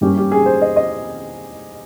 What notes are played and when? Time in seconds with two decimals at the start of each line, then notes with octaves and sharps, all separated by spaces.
0.01 G2 G3 A#3 C#4 G4
0.17 G4
0.32 G#4
0.46 C5
0.61 D#5
0.76 D#5